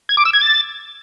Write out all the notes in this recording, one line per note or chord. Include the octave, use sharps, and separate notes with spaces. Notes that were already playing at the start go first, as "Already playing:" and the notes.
G#6
D6
E6
G#6
A6